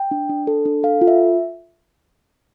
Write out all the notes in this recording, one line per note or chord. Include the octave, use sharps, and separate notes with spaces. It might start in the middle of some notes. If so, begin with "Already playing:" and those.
Already playing: G5
D4
D4
A4
D4
A4 F5
F4
E5